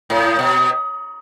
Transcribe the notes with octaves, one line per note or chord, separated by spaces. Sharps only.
A2
B2